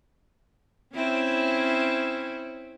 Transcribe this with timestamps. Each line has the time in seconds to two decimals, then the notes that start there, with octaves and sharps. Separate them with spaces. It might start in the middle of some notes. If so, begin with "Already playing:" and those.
0.95 C4 C#4 E4